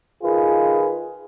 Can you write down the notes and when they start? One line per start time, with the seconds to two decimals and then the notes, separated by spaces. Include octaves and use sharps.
0.23 D#3 F4 G#4 B4